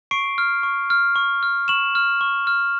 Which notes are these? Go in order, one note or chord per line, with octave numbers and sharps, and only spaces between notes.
C#6 C7 D7
F6
C#6
F6
C#6
F6
C#6 E7 F#7
F6
C#6
F6